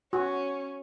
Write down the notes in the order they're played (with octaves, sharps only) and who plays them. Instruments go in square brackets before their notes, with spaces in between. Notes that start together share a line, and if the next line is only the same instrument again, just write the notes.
[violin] C#4 [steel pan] F#4